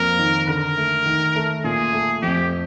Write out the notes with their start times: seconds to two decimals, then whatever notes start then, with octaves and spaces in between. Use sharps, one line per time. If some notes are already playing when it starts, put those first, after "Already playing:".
Already playing: F2 A#3 A#4
0.19 D#3
0.48 D3 A#4
0.78 A3
1.06 D#3
1.36 A3
1.64 A#2 G#4
1.93 A3
2.22 F2 G4